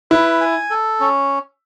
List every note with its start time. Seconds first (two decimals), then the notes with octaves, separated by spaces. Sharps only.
0.11 E4 B4
0.41 G#5
0.70 A4
1.00 C#4